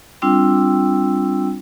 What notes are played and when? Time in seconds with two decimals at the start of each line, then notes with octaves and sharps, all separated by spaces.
0.22 G3 C4 D4 F4 G5 E6